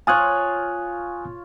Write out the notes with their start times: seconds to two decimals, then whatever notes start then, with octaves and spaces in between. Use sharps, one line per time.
0.07 F4 C#5 G#5 D#6 F#6